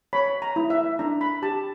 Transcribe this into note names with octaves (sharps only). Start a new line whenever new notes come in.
C#5 B5
A#5
E4
E5
D4 A#5
B5
G4 A5